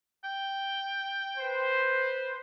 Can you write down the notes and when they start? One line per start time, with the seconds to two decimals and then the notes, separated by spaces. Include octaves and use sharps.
0.24 G5
1.38 B4 C5